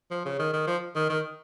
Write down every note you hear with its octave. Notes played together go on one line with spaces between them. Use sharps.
F3
C#3
D#3
D#3
F3
D#3
D#3